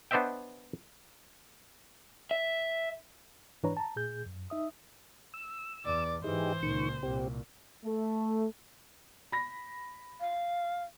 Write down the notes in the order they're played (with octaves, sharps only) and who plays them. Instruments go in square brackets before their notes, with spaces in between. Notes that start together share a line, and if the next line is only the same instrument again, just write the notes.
[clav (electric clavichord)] B3 D4 C5 D#5 E5 G5
[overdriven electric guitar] E5
[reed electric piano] G#2 E3 D4 B4 C#5 A#5
A5 A#5
A#2 G#4 G6
F#2
D#4 E5 D#6
[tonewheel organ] E6
[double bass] E2 [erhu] D5
[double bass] G#2 E3 [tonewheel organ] D#4 G4 G#4 [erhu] C5
[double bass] C#2 A#2 [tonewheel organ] D#3 C#6
[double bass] C2 A#2 [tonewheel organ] C4 G4
[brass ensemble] A3
[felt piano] B5 A#6
[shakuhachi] F5